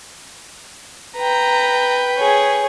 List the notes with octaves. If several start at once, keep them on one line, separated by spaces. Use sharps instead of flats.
B4 G5 A#5
G#4 C#5